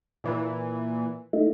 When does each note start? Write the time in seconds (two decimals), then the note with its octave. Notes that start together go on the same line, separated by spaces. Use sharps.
0.24 A#2 E3
1.33 A3 D#4 E4